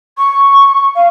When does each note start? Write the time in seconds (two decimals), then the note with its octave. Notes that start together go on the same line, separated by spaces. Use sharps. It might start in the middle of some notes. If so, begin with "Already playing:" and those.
0.18 C#6
0.95 F5